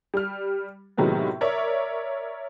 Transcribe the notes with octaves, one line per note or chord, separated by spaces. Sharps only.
G3 F6
A2 C3 D#3 F#3 G#3 B3
A#4 C#5 D5 E5